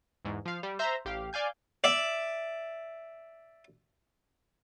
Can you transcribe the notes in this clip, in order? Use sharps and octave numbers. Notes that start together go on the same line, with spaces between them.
E2 G#2
F3 F5
G3
C5 E5 A#5
A1 G4 F5
D5 F5 G#5 G6
D5 E5